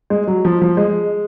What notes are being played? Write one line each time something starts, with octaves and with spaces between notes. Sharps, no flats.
G#3
F#3
F3
F3
G#3